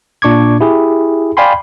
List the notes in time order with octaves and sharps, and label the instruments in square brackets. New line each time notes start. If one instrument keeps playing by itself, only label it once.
[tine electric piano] A#2 D4 C#6 D6 G#6
E4 G4 G#4
D5 F5 G5 G#5 B5 C6